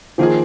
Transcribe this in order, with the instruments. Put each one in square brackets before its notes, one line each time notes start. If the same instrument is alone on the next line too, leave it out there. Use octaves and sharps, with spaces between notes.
[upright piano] D#3 A#3 F4 G#4 [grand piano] F3